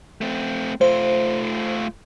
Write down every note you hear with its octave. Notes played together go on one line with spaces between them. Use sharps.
A3 C4
A3 F4 C5